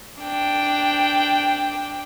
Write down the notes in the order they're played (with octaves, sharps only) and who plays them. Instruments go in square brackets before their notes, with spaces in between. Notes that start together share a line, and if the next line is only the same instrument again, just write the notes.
[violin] D4 G5